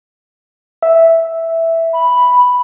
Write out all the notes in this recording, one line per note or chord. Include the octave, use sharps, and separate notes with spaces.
E5
B5